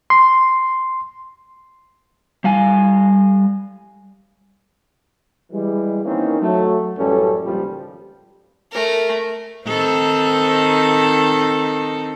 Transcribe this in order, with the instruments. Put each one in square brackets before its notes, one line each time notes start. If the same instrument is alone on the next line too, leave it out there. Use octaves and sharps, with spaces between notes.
[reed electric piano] C6
[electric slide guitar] G3 F5 G#5
[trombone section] E3 G3 G#3
D#3 E3 A#3 C4 C#4 D#4
F#3 A3
A1 F#2 E3 G3 C#4 A4
G#1 C#2 A#2 F3 G3
[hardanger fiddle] A3 A#4
[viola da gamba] D#3 C4 A4